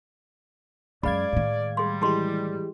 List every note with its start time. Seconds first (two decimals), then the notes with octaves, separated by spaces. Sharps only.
1.03 F#2 F#3 G#3 D5 F5 B5 G#6
1.33 A2 D#3
1.77 G3 G#4 C6
2.02 E3 G#3 E4 G4 G#4 C6